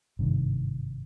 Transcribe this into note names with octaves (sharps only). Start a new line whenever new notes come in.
G#1 G2 C3 D#3